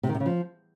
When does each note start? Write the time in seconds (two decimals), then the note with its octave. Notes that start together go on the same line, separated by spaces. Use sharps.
0.03 C3
0.09 D#3
0.15 C3
0.20 C#3
0.26 F3